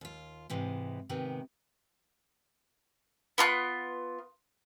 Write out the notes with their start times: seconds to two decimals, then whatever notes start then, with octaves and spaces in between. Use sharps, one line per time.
0.01 D#2 F4
0.50 G#2 C3 E3 G#3
1.09 G#2 C3 D#3 B3
3.38 B3 F4 C6 F#6